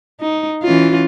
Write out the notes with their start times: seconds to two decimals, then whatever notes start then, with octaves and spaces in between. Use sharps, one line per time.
0.21 D#4
0.63 E3 C#4 F4